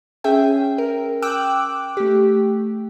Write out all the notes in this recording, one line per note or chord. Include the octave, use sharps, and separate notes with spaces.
C#4 G#4 E5 G5
A#4
G5 D6 E6 F#6
A3 G4